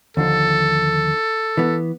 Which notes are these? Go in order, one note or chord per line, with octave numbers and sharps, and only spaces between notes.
D#2 D3 F3 A4
E3 B3